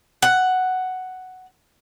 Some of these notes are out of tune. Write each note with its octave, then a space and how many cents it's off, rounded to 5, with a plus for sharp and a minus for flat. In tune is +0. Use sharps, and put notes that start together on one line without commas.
F#5 +5